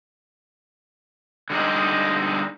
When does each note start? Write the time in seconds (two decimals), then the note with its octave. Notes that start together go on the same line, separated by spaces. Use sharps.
1.50 D3 G3 G#3 D#4